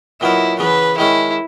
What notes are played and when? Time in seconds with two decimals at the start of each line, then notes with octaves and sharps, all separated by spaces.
0.21 A#2 F#3 B3 D#4 E4 A#4
0.59 C#3 E3 B3 B4
0.98 D#3 G#3 C#4 E4